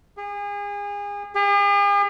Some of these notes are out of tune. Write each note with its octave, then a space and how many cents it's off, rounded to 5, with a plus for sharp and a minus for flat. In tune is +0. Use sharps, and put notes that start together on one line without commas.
G#4 -35
G#4 -45